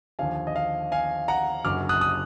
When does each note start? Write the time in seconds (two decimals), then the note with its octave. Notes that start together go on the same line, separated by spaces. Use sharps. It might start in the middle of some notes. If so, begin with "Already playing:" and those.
0.19 D#2 D3 F3 F5 G#5
0.47 D#5
0.56 F5
0.92 F5 G#5
1.28 F#5 A#5
1.65 F#1 F#2 D3 F#3 D6 F6
1.89 D#6 F#6
2.01 D#6